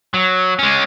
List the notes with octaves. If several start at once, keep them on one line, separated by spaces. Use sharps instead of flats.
F#3
G#3 C#4